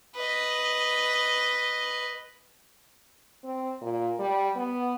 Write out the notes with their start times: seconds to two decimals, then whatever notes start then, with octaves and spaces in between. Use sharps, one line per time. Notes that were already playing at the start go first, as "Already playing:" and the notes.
0.15 B4 D#5
3.45 C4
3.82 A#2
4.20 G3
4.56 B3